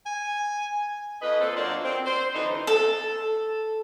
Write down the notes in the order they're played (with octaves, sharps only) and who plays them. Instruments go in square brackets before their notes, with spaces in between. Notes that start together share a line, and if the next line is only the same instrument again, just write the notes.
[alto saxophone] G#5
[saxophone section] F2 B4 D#5
A#2 A4 C5
F#3 A#3 D4 F#4 C5 D5
C4
C5
D3 E3 F#3 D#4
[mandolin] A4